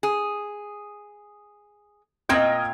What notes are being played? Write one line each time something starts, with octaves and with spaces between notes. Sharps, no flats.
G#4
A#2 C4 D#5 G5 F6 G#6